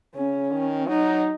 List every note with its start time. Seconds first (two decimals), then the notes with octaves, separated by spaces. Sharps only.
0.15 C#3 C#4
0.51 D#3
0.87 F#3 D#4